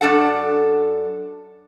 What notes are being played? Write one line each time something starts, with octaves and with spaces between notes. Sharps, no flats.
F#2 D4 A4 F#5